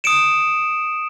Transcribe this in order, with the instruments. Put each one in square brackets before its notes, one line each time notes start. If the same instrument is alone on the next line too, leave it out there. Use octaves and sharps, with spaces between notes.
[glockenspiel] D#6 C#7 D7 E7